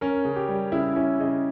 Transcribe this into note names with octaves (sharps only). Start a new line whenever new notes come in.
C#4 A#4
C#3
G4
G3
C#3 E4
C#4 E4
C#3 D#5